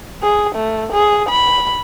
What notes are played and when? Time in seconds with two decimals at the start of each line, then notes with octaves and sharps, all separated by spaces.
0.23 G#4
0.55 A3
0.93 G#4
1.29 B5